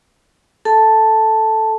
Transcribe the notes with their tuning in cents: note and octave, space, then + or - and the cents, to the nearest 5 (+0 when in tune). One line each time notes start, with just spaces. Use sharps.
A4 +0 A5 +0